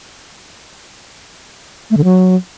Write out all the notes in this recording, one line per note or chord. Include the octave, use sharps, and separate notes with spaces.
A3
D3
F#3